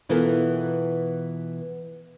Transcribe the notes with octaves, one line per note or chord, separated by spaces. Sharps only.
B2 E3 B3 F4 A4 A#4